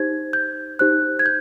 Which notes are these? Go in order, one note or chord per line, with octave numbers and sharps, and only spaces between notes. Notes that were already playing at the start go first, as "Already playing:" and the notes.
Already playing: D#4 G4 C5 G#6
G6
D#4 G4 C5 F#6
G#6
G6